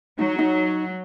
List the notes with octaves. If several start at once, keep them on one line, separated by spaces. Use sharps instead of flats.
F#3 D#4
D#4